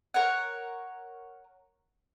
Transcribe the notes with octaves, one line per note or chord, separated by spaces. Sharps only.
A#4 C#5 F#5